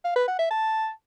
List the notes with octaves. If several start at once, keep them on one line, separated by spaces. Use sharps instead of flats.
F5
B4
F#5
E5
A5